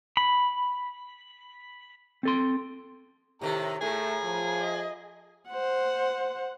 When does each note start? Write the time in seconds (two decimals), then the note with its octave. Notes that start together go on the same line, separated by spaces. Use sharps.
0.17 B5
2.23 C4 A4 C6
3.41 A2 C3 D#3 G4 A#4
3.82 A2 A3 G#4 A#4
4.24 F3
4.60 D#5
5.50 C5 F#5